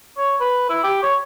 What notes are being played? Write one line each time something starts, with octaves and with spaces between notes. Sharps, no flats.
C#5
B4
E4
G4
C#5